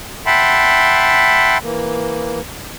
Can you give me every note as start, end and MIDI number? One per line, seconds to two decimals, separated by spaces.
0.26 1.58 76
0.26 1.58 78
0.26 1.58 79
0.26 1.58 81
0.26 1.58 83
0.26 1.58 84
1.63 2.41 52
1.63 2.41 58